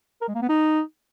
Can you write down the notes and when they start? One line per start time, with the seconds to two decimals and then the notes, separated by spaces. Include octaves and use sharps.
0.21 A#4
0.28 G#3
0.35 A#3
0.42 B3
0.49 D#4